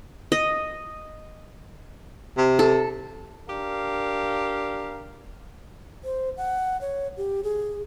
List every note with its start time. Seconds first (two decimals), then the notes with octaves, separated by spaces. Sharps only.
0.32 D#5
2.38 C3
2.59 A4
3.48 D4 G4 A#4 F5
6.04 C5
6.37 F#5
6.81 C#5
7.17 G4
7.44 G#4